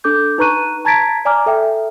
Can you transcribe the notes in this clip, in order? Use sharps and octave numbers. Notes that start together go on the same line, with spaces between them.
D4 A4 D6 G6
D#4 B4 A#5 C#6 F#6 D#7
A5 A#5 G#6 A6 B6 D7
D5 G#5 A#5 D6 F6
A4 E5 G5